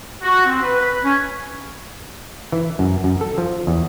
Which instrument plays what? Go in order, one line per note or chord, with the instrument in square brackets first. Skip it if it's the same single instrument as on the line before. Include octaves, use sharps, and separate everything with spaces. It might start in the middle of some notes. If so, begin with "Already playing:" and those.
[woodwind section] F#4
C4
B4
B4
C#4
[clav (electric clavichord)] E3
F#2
F#2
A4
F3
E2